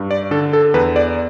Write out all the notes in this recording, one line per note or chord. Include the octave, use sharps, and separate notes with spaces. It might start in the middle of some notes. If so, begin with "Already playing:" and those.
Already playing: G2
D5
D3 A4
A4
E2 B4
D5